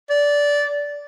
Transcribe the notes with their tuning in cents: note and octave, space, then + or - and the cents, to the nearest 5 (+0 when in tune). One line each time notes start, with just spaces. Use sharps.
D5 -15